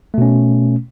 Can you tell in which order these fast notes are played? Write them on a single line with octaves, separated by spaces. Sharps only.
A3 B2 C#4